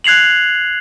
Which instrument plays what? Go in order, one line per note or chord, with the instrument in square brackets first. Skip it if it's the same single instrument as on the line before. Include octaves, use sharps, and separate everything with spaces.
[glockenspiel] F#6 G#6 C7 F7 F#7